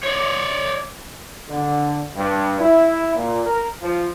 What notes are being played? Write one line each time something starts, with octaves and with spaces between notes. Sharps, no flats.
C#5 D5
D3
G2
E4
A#2
A#4
F3